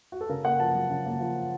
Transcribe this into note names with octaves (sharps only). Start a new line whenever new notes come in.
F#4
A4
C#3 A#4
A#3 F#5
F3 A5
F#2
C#3
A#3
F3